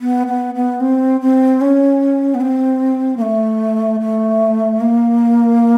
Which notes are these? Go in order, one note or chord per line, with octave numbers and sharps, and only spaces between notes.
B3
B3
B3
C4
C4
C#4
B3
C4
A#3
A3
A3
A#3